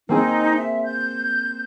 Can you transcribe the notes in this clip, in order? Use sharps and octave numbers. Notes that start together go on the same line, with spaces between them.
A#3 C4 D#4 G#4
E5
G6